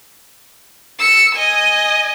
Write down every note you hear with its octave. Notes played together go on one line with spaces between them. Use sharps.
E6 C#7
D#5 G#5